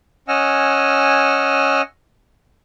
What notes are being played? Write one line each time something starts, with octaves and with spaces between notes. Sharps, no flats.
C#4 D#5 F#5 G#5 E6 F6